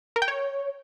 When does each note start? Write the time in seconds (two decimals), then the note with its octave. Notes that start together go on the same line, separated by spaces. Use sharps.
0.16 A#4
0.22 G5
0.28 C#5